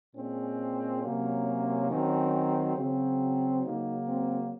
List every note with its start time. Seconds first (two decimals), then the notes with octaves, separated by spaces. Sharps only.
0.15 A#2 G#3 C4 C#4
1.02 C3 F#3 A#3
1.89 D#3 F#3 C4
2.76 C#3 F#3 C4
3.63 C#3 F#3 A#3 D#4
4.06 C4